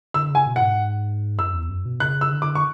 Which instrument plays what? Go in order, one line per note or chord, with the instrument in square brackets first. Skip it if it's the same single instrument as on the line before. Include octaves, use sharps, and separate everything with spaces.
[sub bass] D3 [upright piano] E6
[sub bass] C#3 [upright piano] G#5
[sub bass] B2
[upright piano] F#5
[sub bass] G#2
[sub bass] F#2 [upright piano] E6
[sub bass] E2
F#2
B2
[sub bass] C#3 [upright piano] F#6
[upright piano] E6
[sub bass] D3
[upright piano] D6
C#6